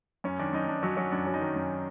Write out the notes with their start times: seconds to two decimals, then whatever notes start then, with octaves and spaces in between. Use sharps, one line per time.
0.24 F#2 C#4
0.39 D#3 D4
0.53 F#2 D#4
0.68 F#2 D4
0.83 F#3 C#4
0.97 F#3 C#4
1.12 F#2 D4
1.27 F#3
1.34 D#4
1.41 D#3
1.56 F#2